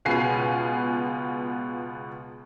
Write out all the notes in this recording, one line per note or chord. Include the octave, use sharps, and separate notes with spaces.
C#2 B2 B3 F4 G#5 C7